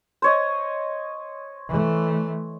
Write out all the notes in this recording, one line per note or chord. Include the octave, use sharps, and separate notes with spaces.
C5 C#5 D#5
E3 A3